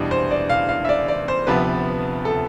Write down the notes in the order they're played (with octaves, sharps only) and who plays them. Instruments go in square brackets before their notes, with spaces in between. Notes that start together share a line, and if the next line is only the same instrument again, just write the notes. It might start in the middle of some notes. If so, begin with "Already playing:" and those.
Already playing: [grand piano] E2 B2 G3 D4
[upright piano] C5
D5
F5
F5
E5
D5
D5
C5
[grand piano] D2 C3 F3 B3 [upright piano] B4
[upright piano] A4